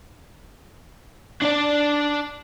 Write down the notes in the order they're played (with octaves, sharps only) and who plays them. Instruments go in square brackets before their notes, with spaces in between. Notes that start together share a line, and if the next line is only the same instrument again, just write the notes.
[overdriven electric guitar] D4 D5